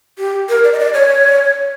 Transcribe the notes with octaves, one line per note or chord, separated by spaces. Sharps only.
G4
A#4
D5
D#5
D5
C#5